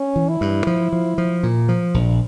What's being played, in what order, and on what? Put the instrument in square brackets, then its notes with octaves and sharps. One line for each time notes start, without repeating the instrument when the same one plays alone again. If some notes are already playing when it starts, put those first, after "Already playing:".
Already playing: [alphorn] C#4
[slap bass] E3
[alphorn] E4
[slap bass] G2
F3
F3
F3
A#2
F3
A#1